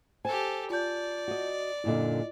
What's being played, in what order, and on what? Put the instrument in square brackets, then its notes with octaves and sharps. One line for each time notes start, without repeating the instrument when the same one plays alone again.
[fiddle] G4 A4 [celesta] C5 [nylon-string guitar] G#5
[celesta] F4 A5 G6 [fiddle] D5
[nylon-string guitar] F#4 D#5
[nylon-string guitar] F#2 A#2 D3 [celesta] E4 F4 D#5